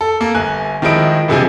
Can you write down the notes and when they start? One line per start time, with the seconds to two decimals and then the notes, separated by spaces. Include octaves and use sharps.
0.01 A4
0.21 A#3 A4
0.35 G1 G#5 F#6
0.82 D#3 F3 G#3 E4 D#5 D7
1.28 F#1 G2 C3 F3 G#4 G#5